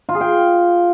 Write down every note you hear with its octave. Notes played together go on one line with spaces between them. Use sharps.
F4
G#4
G5